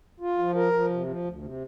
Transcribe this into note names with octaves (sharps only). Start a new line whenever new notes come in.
F4
F3
A#4
F3
C3
F3
D2
C3